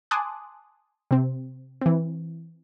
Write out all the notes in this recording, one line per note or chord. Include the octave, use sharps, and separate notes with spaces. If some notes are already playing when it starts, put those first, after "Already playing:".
G#5 A5 C6 D6 D#6 F#6
C3 C4
E3 C4